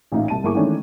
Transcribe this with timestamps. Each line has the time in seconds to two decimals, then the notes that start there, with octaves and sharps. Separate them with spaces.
0.12 A1 A#2 D#4 E5 F5
0.28 C2 A5 D#7
0.43 G1 A#3 E4 G#4 C#6 D6
0.55 D#3 E3 G#3 A3 C#4 D4